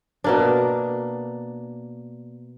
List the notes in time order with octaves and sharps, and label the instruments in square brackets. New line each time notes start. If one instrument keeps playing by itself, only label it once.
[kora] B2 A#3 D4